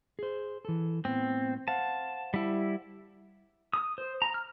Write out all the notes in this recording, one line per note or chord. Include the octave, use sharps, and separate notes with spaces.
G#4 C5
E3 A4
A2 B3 C4
C5 F5 F#5 A5
G3 E4
D#6
C5
A#5
F6